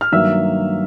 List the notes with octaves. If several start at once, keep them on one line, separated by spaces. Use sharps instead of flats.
F6
G2 D#3 F#3 A#3 E5 E6